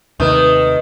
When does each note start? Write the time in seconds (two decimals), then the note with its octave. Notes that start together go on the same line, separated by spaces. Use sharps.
0.20 D#2 C3 D#3 A3 B4 D#6